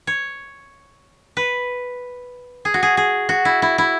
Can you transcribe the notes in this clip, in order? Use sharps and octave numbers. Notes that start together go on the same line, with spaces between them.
C#5
B4
G#4
F#4
G#4
G#4
F#4
E4
E4
E4